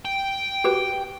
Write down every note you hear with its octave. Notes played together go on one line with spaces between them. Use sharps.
G5
F#4 G4 B4